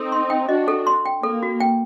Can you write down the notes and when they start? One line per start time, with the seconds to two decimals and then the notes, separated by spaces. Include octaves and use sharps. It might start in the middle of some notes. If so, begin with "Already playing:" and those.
Already playing: C4 D#4 A4
0.12 C6
0.30 G5
0.49 D4 F#4 D#5
0.68 A4
0.87 C6
1.06 G5
1.23 A#3 A4
1.43 F#4
1.60 G5